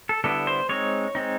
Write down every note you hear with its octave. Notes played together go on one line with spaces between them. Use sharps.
A4
D3 G3 B3 E4 A4
C5
G#3 C4 D#4 C#5
G#3 C4 D#4